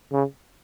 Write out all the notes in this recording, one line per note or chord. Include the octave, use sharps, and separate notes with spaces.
C#3